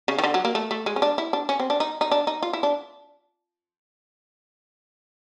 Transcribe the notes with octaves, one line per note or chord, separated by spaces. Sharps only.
C#3
D#3
D3
F#3
A#3
A3
A3
G#3
C#4
D4
E4
D4
C#4
C4
D4
D#4
D#4
D4
D#4
F4
E4
D4